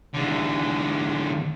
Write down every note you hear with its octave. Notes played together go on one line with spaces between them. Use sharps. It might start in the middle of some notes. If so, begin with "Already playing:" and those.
E2 D3